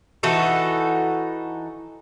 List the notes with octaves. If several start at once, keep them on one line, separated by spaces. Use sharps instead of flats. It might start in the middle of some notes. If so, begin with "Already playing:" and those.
E3 D#4 F#4 A4